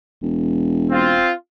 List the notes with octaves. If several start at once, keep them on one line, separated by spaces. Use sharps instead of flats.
E1
C4 F4